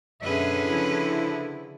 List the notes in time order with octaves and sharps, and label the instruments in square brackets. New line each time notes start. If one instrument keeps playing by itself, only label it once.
[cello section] F#2 B2 E5 [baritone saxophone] D3 [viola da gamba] C#4 G#4 B4
[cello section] C#3 F3 E4